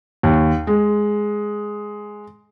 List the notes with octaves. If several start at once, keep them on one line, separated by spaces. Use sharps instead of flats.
D#2
G#3